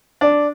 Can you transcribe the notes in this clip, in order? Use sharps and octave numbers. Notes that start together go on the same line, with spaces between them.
D4